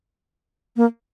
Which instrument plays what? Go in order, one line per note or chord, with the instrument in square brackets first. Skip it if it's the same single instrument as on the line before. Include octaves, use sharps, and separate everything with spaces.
[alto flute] A#3